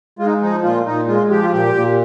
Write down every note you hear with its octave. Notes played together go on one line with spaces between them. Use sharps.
G#3 F4
D#4
F3 D#4
A#2 F4
A#2 D#4
G#3 F4
F3 G4
F4
A#2 G4
A#2